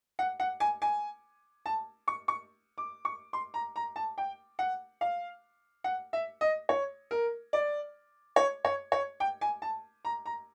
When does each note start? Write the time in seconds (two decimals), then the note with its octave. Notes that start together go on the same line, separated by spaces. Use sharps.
0.19 F#5
0.40 F#5
0.60 G#5
0.82 G#5
1.66 A5
2.08 C#6
2.28 C#6
2.78 D6
3.05 C#6
3.33 C6
3.54 A#5
3.76 A#5
3.96 A5
4.18 G5
4.59 F#5
5.01 F5
5.84 F#5
6.13 E5
6.41 D#5
6.69 C#5
7.11 A#4
7.53 D5
8.36 C#5
8.65 C#5
8.92 C#5
9.20 G5
9.41 G#5
9.62 A5
10.05 A#5
10.26 A#5